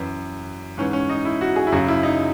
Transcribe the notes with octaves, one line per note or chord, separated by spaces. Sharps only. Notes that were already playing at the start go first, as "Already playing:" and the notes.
Already playing: F#2 E3
G#2 E3 C#4
C#4
D#4
E4
F#4
G#4
E4
F#2 C#3 F#3 F#4
E4
D#4